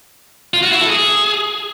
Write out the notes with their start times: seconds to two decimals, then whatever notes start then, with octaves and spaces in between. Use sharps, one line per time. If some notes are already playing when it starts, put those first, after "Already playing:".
0.54 F4
0.63 F#4
0.72 E4
0.81 A4
0.90 G#4